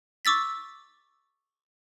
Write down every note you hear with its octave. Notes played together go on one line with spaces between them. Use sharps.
C#6 D6 E6 A6 B6